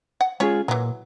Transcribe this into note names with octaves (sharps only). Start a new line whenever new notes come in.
F#5
G#3 C#4 F4 G#4 C#5
A#2 E3 F#3